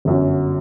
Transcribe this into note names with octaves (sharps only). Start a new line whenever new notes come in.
G1 F#2 F#3